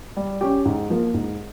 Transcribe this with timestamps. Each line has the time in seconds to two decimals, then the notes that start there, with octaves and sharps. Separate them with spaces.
0.17 G3
0.41 C#4 G4
0.65 G#2
0.90 F3 A#3
1.14 G#2